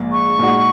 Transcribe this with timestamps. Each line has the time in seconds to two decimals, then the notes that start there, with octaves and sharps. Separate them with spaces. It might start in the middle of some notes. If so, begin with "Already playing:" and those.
Already playing: A#1 G#2 A#3
0.12 C#6
0.39 A#2 G#3 D#4 F#4